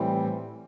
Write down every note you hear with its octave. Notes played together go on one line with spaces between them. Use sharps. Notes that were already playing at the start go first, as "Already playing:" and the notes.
Already playing: A2 E3 G3 C4